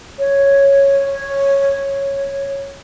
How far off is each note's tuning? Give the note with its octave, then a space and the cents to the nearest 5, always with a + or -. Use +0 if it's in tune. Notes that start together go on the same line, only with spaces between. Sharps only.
C#5 -5